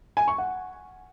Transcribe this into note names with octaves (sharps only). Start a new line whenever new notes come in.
G#5
C#6
F#5